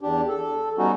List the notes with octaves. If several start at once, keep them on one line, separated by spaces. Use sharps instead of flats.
E2 D4 G4
A4
G3 B3 C#4 D#4 F#4